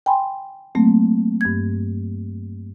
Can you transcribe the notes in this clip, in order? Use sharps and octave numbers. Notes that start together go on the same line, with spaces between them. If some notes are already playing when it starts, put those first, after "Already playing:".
G5 G#5 B5 C6
F#3 A3 A#3 C4
G2 G#6